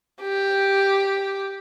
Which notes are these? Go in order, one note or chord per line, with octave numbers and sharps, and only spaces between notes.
G4